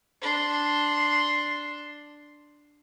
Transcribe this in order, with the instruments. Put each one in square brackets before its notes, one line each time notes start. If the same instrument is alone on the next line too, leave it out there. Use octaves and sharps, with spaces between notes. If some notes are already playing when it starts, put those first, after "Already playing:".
[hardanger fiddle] D4 C6